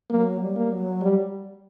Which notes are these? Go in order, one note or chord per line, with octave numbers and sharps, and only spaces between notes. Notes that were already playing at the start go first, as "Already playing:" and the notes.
F#3 A#3
G3
A#3
F#3
G3